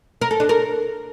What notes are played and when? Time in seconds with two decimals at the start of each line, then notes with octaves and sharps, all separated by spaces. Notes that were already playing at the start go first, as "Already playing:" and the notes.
0.21 A#4
0.31 A4
0.40 D4
0.49 A#4